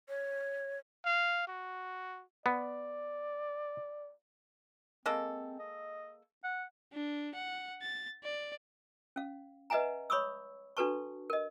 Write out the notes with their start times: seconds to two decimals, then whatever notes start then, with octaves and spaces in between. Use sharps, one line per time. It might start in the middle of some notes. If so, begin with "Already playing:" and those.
0.09 C#5
1.06 F5
1.48 F#4
2.46 B3 D5
5.06 G#3 A#3 C4 A4
5.59 D#5
6.44 F#5
6.93 D4
7.35 F#5
7.82 A6
8.24 D5
9.16 C#4 F5
9.70 B4 D#5 E5 F#5 G#5 A#5
10.10 C#5 B5 C#6 D#6 E6
10.77 D4 F#4 A4 B4 A5 C#6
11.30 A#4 D#5